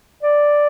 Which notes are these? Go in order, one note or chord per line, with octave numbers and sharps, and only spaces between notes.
D5